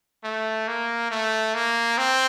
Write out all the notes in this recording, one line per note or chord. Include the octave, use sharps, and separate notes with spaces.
A3
A#3
A3
A#3
C4